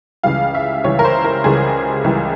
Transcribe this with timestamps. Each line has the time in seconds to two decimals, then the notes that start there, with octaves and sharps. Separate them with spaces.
0.23 C#2 C#3 E3 G3 F5
0.54 E5
0.84 C#2 C#3 E3 G3 C#5
0.99 A#4
1.04 C5
1.24 A#4
1.44 C#2 C#3 E3 G3 G#4
2.04 C#2 C#3 E3 G3